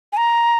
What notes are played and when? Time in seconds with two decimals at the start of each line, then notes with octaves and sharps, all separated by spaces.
0.13 G#5
0.17 A#5